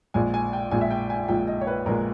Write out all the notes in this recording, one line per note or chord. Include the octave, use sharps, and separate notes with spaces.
A#1 A#2 G#3 G#5
G#5
G5
A#1 A#2 G#3 G#5
E5
G5
G#5
A#1 A#2 G#3 G5
D#5
C#5
B4
A#1 A#2 G#3 A#4